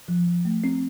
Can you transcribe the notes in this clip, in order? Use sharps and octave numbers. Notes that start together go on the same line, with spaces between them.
F3
F3
A3
C4